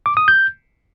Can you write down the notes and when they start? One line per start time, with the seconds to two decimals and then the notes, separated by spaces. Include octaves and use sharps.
0.06 D6
0.17 D#6
0.28 G6